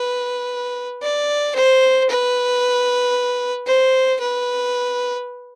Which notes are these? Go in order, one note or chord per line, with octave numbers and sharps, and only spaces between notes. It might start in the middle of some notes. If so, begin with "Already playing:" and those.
Already playing: B4
D5
C5
B4
C5
B4